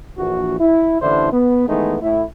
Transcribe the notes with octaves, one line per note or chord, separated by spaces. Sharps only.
A#1 E3 F#4
E4
A1 D3 E3 D4 E4 C5
B3
D#3 E3 G#3 A3 B3 D#4
A2 E4